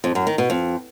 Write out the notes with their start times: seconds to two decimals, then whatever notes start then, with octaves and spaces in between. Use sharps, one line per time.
0.04 F2
0.15 F#2
0.27 D#3
0.38 B2
0.50 F2